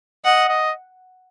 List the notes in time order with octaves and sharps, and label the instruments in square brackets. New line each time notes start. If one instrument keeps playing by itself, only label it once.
[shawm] D#5 [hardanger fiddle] F#5
[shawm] D#5